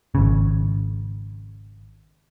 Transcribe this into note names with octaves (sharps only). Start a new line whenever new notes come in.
G#1 C#3